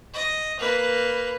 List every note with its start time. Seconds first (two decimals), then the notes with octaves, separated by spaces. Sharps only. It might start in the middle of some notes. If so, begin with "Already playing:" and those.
0.14 D#5
0.59 A#3 B4